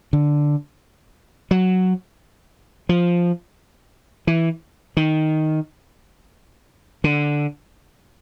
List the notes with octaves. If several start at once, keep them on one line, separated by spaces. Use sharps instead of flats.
D3
F#3
F3
E3
D#3
D3